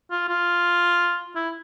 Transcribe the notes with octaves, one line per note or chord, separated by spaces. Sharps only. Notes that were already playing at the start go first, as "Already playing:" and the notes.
F4
F4
E4